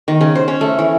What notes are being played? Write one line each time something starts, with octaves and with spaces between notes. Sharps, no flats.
D#3
C#3
C5
C#4
A3
E3